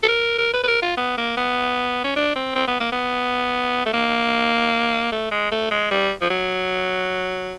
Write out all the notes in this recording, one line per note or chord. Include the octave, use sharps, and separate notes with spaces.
A4
A#4
A#4
B4
B4
A#4
F4
B3
A#3
B3
C#4
D4
C4
C4
B3
A#3
B3
A3
A#3
A3
G#3
A3
G#3
G3
F3
F#3